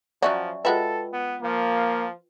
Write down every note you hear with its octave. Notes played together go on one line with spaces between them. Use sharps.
F3 F#3 C#4 F#4 D5 E5 C#6
G#3 F4 F#4 A4 B4 E5 G5
B3
F3 A#3